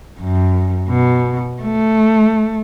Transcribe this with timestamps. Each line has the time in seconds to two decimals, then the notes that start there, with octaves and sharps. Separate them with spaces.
0.21 F#2
0.89 B2
1.62 A3